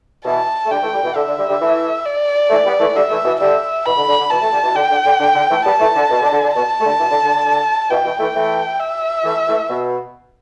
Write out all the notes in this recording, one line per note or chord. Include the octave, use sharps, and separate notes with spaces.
B2 E3 A5
A3
D3 G3 G5
E3 A3
D3 G3
B2 E3
D3 E5
D3
D3 G3
D3 G3
E3 A3
D5
E3 A3
G3 B3
E3 A3
D3 G3 E5
E3 A3
B2 E3
D3 G3 E5
B2 E3 B5
D3
D3
D3
B2 E3 A5
E3 A3
D3 G3
B2 E3
D3 G5
D3
D3
D3
D3
E3 A3
G3 B3 A5
E3 A3
D3
B2
D3
D3
D3
B2 A5
A3
D3 G3
B2 E3
D3
D3
D3
D3
B2 E3 G5
B2 E3
E3 A3
E3 A3
E5
E3 A3
E3 A3
B2